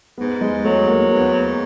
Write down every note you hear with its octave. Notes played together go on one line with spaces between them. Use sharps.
G#2 B3
G#3
F#3 A3
A#3
G#2 B3